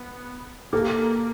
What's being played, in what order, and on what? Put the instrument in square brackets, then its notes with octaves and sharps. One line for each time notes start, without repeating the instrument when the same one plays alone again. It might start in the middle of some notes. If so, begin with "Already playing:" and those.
Already playing: [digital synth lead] B3
[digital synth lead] A#3 [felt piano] G4 A4